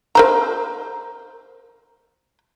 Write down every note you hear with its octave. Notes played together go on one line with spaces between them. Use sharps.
A#4 C5 A#5